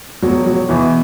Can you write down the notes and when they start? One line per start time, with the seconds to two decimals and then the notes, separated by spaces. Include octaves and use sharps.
0.22 E1 F#3
0.46 F#3
0.69 E2 B2 E3